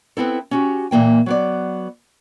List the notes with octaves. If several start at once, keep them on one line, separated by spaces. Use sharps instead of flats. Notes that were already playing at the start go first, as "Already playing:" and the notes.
B3 C4 E4 A4
C#4 F#4 G4
A#2 E3 A#3 G5
F#3 B3 D5